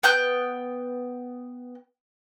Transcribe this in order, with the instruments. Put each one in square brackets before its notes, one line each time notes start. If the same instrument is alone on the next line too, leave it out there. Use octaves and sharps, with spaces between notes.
[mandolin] B3 G5 F#6 G6